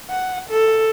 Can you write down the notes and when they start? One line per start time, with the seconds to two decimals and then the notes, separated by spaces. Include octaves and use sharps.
0.10 F#5
0.49 A4